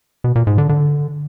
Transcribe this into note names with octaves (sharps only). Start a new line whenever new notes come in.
B2
A#2
G#2
D3
D3